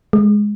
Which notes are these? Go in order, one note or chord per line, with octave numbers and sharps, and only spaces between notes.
G#3